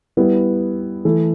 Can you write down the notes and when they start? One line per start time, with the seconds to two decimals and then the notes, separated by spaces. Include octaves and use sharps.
0.17 G3 B3 E4
1.05 E3 A3 E4